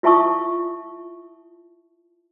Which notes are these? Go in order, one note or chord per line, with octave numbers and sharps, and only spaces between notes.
E4 F4 E5 A5 C#6 D#6